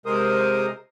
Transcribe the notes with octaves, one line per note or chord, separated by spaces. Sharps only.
C3 G#3 A#4 C5 D#6